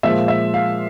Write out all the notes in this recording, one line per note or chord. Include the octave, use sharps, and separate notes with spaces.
A#2 F3 G#3 E5
E5
F5